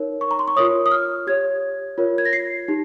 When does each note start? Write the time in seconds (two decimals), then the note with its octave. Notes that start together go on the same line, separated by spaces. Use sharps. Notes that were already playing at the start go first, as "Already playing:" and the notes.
Already playing: D#4 A#4 C#5
0.21 C#6
0.31 A#5
0.39 C6
0.48 C#6
0.56 F4 A#4 C#5 D#6
0.86 D#6
0.92 F6
1.27 G4 C#5 G#6
1.98 F4 A#4 C#5
2.18 G#6
2.25 A#6
2.33 C7
2.68 D#4 G4